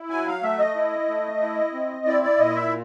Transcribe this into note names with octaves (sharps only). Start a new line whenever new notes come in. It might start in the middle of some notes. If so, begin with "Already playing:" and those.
Already playing: E4
F#3 G#5
F5
A3 E5
D#5
E4
A3
E4
C4
E4 D5
D5
A#2 D#5
E5